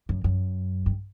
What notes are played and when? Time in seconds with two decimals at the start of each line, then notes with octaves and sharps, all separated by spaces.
0.09 F#2
0.24 F#2
0.86 G2